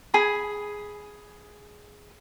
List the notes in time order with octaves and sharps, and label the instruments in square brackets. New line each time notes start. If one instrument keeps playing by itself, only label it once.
[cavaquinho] G#4 G#5 B5